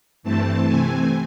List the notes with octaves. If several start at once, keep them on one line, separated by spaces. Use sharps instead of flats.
G2 E3 A3 C4 A5
C3 E3 A3 C4 G#5